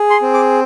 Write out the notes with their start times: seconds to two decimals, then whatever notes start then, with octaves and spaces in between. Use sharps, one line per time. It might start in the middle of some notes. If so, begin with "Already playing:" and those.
Already playing: G#4
0.10 C6
0.22 C4
0.34 D6